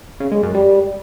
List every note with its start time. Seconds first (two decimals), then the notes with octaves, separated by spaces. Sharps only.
0.20 C#3
0.32 G#3
0.43 F#2
0.54 G3